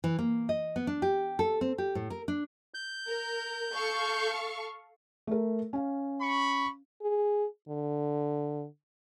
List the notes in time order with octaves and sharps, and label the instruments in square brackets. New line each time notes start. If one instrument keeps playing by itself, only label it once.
[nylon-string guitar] E3
A#3
D#5
B3
D4
G4
A4
C4
G4
A2
A#4
D4
[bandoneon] G6
[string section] A#4
A4 F5 C#6
[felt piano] A3 A#4
C#4 F5
[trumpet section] B5 C#6
[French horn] G#4
D3